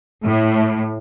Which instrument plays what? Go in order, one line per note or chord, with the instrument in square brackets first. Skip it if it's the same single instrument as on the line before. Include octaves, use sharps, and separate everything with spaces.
[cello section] A2